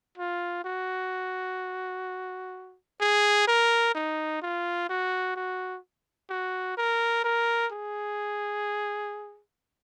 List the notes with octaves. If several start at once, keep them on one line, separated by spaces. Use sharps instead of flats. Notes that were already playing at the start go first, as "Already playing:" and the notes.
F4
F#4
G#4
A#4
D#4
F4
F#4
F#4
F#4
A#4
A#4
G#4